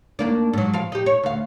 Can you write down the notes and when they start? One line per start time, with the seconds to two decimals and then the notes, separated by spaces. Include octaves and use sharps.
0.19 D#2 A#3 D4
0.53 G#2 F#3
0.73 F3 F5
0.92 D#4 G4
1.06 C#5
1.23 D2 F5